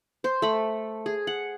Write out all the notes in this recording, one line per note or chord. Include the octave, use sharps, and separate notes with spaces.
C5 C6
A3 B5
G#4
F#5